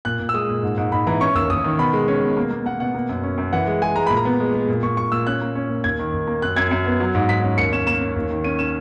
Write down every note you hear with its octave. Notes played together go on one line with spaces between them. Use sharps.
A#2 F#6
A#2
E6
G#3 D#6
A#2
G#2
G#2
G#2 B5
E3 A#5
C#4 C#6
D#2 E6
D#2 D#6
D#3
B2 B5
G#3
C#4
B2
A#3
A#3
A#3 F#5
B2 F#5
A#3
F#2
C#4
F#2
E3 F#5
G#3
G#3 G#5
G#3 A#5
A#2 B5
A#5
B3
G#3
G#3
A#2
A#2 C#6
A#2 C#6
A#2 E6
C#4 F#6
A#3
C#4
A#2
D#2 G#6
D#3
D#2
A#3
F#2 F#6
F#2 G#6
F#2
B3
F#3
G#2
G#2 B6
C#4
D#2 C#7
C#4 E7
A#3 E7
C#4
D#2
D#3
C#4 D#7
C#4 E7